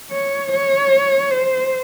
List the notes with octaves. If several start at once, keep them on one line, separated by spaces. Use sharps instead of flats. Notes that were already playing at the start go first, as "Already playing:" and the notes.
C#5
C#5
C5